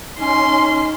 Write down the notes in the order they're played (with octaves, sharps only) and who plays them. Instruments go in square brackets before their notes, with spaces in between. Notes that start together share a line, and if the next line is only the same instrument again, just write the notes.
[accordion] C#4 [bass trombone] D#4 [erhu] C6